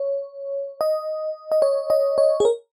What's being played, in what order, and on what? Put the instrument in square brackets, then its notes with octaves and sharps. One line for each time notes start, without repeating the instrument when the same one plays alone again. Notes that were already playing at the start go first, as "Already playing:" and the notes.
Already playing: [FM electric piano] C#5
D#5
D#5
C#5
D#5
C#5
G#4
A#4